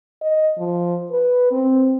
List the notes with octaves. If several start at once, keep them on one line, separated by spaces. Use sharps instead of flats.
D#5
F3
B4
C4